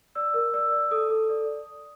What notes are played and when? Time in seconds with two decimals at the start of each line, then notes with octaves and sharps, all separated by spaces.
0.15 D5 E6
0.34 A#4
0.53 D5 E6
0.72 D5
0.91 A4 D#6
1.10 A4
1.29 D5